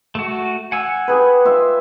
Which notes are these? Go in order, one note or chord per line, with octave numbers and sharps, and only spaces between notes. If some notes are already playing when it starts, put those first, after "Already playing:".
A3 F#4
F#5 G#5 E6
G4 G#4 B4
F4 E5